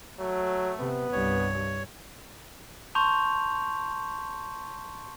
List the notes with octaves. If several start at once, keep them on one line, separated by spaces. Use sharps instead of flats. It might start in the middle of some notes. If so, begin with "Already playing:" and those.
F#3 A3
C3 B3
C2 G2 C#5
A5 C6 C#6 G6 F7